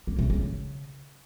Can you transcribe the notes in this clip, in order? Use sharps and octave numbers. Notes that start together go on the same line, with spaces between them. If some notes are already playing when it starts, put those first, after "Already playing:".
A#3
C3
C#3